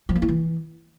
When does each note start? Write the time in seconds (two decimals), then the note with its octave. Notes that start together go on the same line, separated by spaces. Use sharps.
0.09 F3
0.15 A#3
0.22 E4
0.28 E3